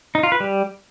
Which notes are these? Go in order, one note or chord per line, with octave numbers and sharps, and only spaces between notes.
D#4
F4
B4
G3